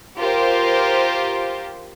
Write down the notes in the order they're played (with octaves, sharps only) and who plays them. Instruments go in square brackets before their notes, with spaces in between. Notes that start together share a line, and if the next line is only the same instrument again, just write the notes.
[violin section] F4 G4 A#4 C5